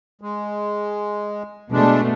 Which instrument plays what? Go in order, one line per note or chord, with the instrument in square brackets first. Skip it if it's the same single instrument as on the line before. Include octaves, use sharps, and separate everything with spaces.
[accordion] G#3
[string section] B2 A3 [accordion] G#3 D4